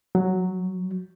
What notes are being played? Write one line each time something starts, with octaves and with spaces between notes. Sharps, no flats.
F#3